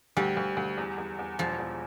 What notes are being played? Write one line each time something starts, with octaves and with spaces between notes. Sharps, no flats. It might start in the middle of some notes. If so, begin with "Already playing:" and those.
D2 G3
D2
D2
E2
E2
E2
E1 F3
E2